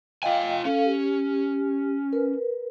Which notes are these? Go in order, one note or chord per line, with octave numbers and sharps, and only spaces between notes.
F4 D#5 F5 G5 G#5
C#4 A4 F5
G4
A#4 B4